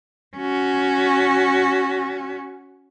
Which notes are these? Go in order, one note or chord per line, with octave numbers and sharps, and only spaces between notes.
C#4 F#4